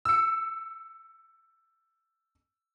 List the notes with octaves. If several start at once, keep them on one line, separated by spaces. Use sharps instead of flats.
E6 C#7